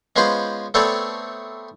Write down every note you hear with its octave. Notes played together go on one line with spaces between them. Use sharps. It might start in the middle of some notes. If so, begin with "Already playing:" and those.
G#3 B3 C#4 F4 B4 C5
A3 B3 C4 A4 C#5 D5